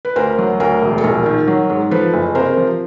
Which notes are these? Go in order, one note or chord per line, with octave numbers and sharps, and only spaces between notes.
B4
D2 A#4 C5
F#3
D2 A#4
E1
A4
A#1 A#4
D#3
F#3
G#2
F3 A4 B4
F#1
C3 A#4 C5
F3